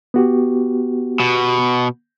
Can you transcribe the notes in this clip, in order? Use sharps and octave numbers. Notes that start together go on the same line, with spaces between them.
B3 F#4 G4
B2